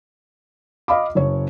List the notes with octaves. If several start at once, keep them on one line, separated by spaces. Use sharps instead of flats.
D#5 F5 B5 D6
F#1 C#5